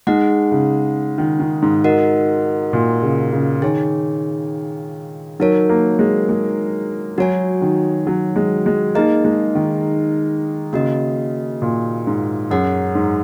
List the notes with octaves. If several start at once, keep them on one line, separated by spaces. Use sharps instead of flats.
G#3 D#4 G#4 F#5
C#3
D#3
D#3
G#2
F#4 A#4 D#5 F#5
A#2
C#3
C#3
D#3 G#4 C#5 G#5
F#3 D#4 A#4 C#5
A#3
G#3
G#3
F#3 F#4 C#5 G#5
D#3
F#3
G#3
G#3
A#3 D#4 G#4 D#5
G#3
D#3
C#3 A#3 F#4 D#5
A#2
G#2
F#2 G#4 C#5 F#5
G#2